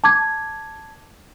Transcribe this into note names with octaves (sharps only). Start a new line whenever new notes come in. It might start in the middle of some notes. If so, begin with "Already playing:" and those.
A5 D6 G#6